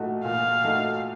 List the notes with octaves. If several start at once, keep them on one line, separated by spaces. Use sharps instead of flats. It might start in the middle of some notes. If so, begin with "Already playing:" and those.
Already playing: A#2 A3 D#4 F#4
A#2 F5
A3 D#4 F#4